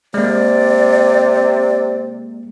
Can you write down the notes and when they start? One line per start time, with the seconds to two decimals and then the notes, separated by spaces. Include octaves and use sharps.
0.14 C3 G#3 A#3 D5